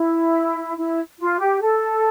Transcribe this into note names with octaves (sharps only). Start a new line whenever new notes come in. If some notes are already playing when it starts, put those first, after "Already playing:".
Already playing: E4
E4
F4
G4
A4